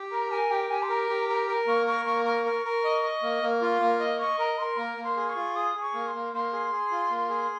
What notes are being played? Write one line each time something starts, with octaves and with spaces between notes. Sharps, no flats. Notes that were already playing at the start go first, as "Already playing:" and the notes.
Already playing: G4
A#4 A#5
A#4 G#5
G4 G5
G4 G#5
C6
A#4 A#5
G4
A#4 A#5
A#4
A#3 C#6
A#4 C#6
A#3 C#6
A#4 C#6
A#4
A#4
D#5
D#5
A#3
A#3
F4
A#3
D#5
D#5 C#6
A#4 A#5
A#4 C6
A#3 A#5
A#3
C6
G#4
C#6
F4
G#4 D#6
G#4
C#6
A#3
C6
A#3
A#3 C6
G#4
G#4
F4
A#3
G#4